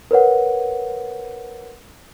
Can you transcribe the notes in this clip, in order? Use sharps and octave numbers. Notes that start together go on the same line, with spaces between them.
A#4 B4 C#5 F#5